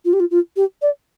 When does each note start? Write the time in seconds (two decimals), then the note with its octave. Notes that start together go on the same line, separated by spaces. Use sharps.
0.05 F4
0.13 G4
0.20 F4
0.31 F4
0.56 G4
0.82 D5